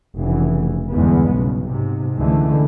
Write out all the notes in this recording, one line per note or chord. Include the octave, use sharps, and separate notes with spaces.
F1 C#3 E3
E2 G2 D3 G#3 B3
B1 G2 C#3
G#2 C3
C#2 D3 E3 G#3 A3